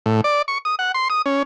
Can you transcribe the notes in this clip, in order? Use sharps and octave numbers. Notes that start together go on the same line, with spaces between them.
A2
D5
C#6
D#6
F#5
C6
D#6
C#4